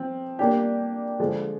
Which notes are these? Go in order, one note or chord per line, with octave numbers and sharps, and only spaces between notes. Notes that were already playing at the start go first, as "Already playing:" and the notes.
Already playing: F3 C4
A#3 D4 G4
D3 F3 G#3